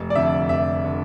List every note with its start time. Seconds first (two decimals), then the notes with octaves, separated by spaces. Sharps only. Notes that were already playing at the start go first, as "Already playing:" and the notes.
Already playing: F1
0.10 D5
0.15 F2 D3 E5
0.49 F1 E5
0.85 D3